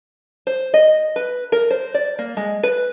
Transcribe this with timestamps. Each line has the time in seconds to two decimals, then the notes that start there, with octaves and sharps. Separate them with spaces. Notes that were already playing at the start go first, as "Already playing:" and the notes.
0.47 C5
0.74 D#5
1.16 B4
1.52 A#4
1.71 C5
1.94 D5
2.19 A#3
2.37 G#3
2.63 B4